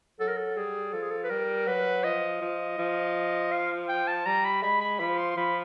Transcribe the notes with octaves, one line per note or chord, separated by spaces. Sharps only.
F#3 A4
A#4
A4
G3 G#4
F3 A4
G#4
A4
B4
G3 A#4
F#3 B4
F3 D#5
F3
F3
F5
G5
A5
G3 A#5
B5
G#3 B5
B5
F3 B5
C6
C6
F3 B5